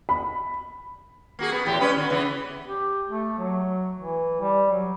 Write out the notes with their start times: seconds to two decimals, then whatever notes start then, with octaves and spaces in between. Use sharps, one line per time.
0.09 B5
1.39 A#3 F#4 G#4
1.52 B3
1.65 E2 A2 G4
1.80 G3 C#4 B4
1.96 D3 F#4
2.10 C#3 E3 B3
2.64 G4
3.09 A3
3.39 F#3
3.99 E3
4.41 G3
4.71 F#3